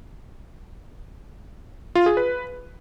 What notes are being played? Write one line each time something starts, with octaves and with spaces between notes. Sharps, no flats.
F4
G#4
B4